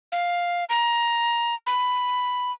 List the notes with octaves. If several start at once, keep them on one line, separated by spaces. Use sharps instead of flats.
F5
A#5
B5